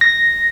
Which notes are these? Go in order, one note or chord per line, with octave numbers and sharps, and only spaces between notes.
A#6